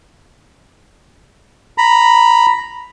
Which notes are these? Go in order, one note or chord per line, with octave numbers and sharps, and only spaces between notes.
A#5 B5